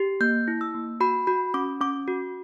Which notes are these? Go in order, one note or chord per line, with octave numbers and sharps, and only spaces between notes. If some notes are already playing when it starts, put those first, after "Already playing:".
Already playing: G4
A#3 G6
E4
E6
A#3
F#4 B5
F#4 B5
C#4 D6
C#4 D6
F#4